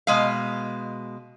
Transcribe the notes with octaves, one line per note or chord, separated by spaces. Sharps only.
B2 G#3 F5